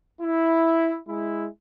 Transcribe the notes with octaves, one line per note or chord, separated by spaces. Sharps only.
E4
G#3 E4